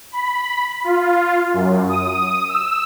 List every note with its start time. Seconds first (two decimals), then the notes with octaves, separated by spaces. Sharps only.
0.12 B5
0.84 F4
1.54 F#2
1.89 D#6
2.48 E6